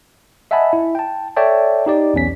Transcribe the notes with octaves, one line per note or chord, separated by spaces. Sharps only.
D#5 E5 F#5 G#5 A5 B5
E4
G5 A5
A4 C#5 D5 E5 G5 A5
D#4 G4 D5
B1 E2 C#4 B6